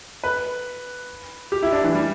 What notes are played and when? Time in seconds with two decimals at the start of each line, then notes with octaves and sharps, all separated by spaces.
0.24 B4
1.52 G4
1.63 E4
1.72 D4
1.84 E3
1.95 G3